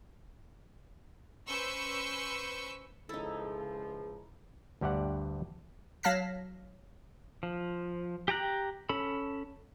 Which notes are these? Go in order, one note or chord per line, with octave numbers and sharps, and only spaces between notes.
C#4 B4 C5 C#6 E6 G6
C#2 F3 D#4 E4 G#4 A4
D2 G2 G4 D5 F#5
F#3 F5 A5 F6 A#6 B6
F3
G4 G5 A#5 F#6
C#4 A4 B5